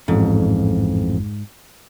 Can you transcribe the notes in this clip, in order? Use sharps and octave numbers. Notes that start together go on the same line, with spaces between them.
A1 F2 G#2